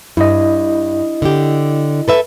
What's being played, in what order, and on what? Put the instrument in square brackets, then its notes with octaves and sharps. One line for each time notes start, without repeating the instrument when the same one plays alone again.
[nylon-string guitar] G2 [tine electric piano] E4 D#5
[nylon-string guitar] D3 G4
A4 B4 E5